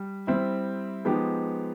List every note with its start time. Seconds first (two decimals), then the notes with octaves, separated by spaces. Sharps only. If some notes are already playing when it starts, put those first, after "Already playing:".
Already playing: G3
0.27 G3 C4 E4
1.05 F3 G#3 B3 D#4 G4